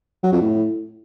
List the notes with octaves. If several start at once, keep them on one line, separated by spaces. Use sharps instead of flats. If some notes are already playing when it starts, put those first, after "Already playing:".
F#3
F2
A2